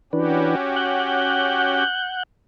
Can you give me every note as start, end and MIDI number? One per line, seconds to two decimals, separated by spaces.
0.13 0.55 52
0.13 1.84 61
0.13 0.55 62
0.13 1.84 66
0.13 1.84 67
0.13 0.55 71
0.76 2.23 78
0.76 2.23 90
0.76 2.23 91